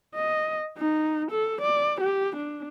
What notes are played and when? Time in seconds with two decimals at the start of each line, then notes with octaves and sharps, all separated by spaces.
0.14 D#5
0.78 D#4
1.31 A4
1.61 D5
2.01 G4
2.36 D4